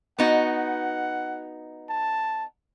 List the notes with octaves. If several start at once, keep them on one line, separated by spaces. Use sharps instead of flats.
B3 D#4 F#4 F#5
A5